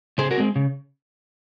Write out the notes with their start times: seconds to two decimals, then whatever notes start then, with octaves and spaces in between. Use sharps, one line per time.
0.18 C#3 G#4 C5
0.31 F#4 A#4
0.38 G#3 C4
0.56 C#3